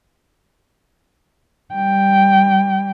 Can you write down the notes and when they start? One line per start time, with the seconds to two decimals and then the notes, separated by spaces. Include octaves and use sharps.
1.74 G3 G5